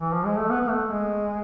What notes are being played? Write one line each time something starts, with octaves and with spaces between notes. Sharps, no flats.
E3
F3
G#3
A3
B3
B3
A3
G#3